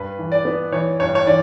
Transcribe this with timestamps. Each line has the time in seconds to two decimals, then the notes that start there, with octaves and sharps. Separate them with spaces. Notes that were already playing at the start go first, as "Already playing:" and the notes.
Already playing: G2 B4
0.19 E3
0.32 D5
0.45 B3
0.72 E3 C#5
1.00 G2 C#5
1.15 C#5
1.27 E3 D5